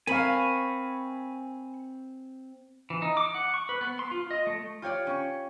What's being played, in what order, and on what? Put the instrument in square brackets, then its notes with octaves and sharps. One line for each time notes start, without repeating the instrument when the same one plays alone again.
[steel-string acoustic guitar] C4 [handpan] A#4 F5 [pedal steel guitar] G#5 B5 C#6
[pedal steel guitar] E3
D#4
D6
F#5
C#6
B4
B3
C6
F4
D#5
A3
[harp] F4 G4 C#5 D5
C#4 C#6